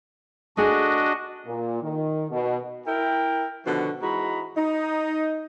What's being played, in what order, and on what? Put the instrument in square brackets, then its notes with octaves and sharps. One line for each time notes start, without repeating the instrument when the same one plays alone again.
[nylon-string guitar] A3 G#4 [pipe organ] D4 F#4 D#5
[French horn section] A#2
D#3
B2
[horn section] E4 A#4 G5
B2 D3 D#3 F3 F#4
G#2 E3 G#3 F#4 A#5 B5
D#4